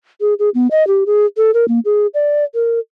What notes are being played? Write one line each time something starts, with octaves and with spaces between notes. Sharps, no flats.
G#4
G#4
B3
D#5
G4
G#4
A4
A#4
A#3
G#4
D5
A#4